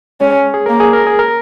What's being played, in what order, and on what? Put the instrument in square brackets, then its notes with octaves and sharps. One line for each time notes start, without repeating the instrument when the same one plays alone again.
[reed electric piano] G#3 [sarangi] C#4
[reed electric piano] G#4
[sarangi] A#3 [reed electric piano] A#4
[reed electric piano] G#4
A#4
G#4
A#4